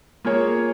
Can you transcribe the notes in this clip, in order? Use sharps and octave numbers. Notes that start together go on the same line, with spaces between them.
A#3 F4 G#4 C#5